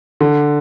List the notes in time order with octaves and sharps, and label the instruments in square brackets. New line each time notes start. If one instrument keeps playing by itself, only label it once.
[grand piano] D3